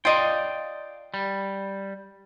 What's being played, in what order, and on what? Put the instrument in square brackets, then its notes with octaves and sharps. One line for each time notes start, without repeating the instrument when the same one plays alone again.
[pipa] F4 D#5 [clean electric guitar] D5 F5 G5
[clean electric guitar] G3